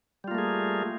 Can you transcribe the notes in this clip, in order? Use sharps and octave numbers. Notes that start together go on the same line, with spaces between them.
G3 A3 A#3 F4 G#4